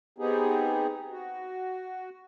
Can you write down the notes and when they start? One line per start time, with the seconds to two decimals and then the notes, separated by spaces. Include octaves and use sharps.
0.18 B3 C4 D#4 G4 G#4
1.10 F#4